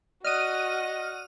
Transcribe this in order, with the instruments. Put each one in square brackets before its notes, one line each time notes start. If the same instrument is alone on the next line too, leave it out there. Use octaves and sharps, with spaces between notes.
[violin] F#4 F#5 [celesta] D5 D#6 F#6 [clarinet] D#5 [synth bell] F6 D#7